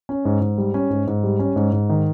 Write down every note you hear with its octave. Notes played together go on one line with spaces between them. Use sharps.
C#4
G#2
G#2
G3
C#4
G#2
G#2
G3
C#4
G#2
G#2
D#3